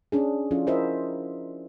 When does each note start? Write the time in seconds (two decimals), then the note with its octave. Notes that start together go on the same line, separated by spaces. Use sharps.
0.12 C#4 D4 G#4
0.51 F3 C#4 E4 F4 A4
0.67 E4 F4 A#4 C5 D#5 E5